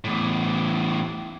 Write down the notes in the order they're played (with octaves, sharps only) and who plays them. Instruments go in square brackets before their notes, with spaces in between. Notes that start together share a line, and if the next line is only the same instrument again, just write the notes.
[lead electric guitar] E2 A2